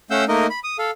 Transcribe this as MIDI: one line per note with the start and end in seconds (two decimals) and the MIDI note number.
0.11 0.25 57
0.11 0.25 61
0.11 0.25 77
0.11 0.25 78
0.11 0.25 88
0.11 0.25 91
0.28 0.47 57
0.28 0.47 58
0.28 0.47 63
0.28 0.47 70
0.28 0.47 75
0.50 0.59 83
0.64 0.77 87
0.79 0.91 69
0.79 0.91 77